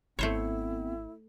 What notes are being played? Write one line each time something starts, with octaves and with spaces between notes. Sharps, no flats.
G#1 A3 B3 C4 E4 C5 C#5